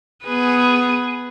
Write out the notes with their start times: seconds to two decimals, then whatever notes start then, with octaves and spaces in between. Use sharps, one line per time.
0.24 B3 G#4 B4